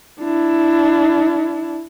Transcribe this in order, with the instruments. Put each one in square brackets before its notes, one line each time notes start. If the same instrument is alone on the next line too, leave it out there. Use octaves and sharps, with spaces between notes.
[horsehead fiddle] D4 E4